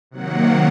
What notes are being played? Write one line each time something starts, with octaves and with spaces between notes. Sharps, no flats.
C3 D#3 F#3 A#3 F#5